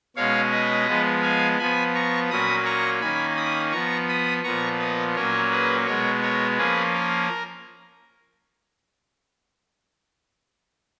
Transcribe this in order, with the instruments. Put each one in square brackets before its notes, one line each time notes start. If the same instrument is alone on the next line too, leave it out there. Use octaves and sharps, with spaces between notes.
[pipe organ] B2 G#3 C#4 C#5 F5
B4 D#5
F3 G#3 B3
F5 G#5
F3 B3 G#5 B5
A#5 C#6
A#2 F#3 A#3 C#4 B5 D#6
A#5 C#6
D#3 A#3 C#4 G#5 B5
B5 D#6
F3 B3 A#5 C#6
B5 D#6
A#2 F3 B3 A#5 C#6
B4 D#5
A#2 F#3 A#3 C#4 A#4 C#5
G#4 B4
B2 G#3 B3 A#4 C#5
A#4 C#5
F3 A#3 C#4 G#4 B4
A#4